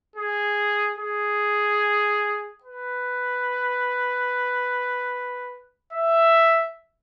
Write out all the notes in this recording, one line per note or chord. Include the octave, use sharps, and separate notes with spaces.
G#4
G#4
B4
E5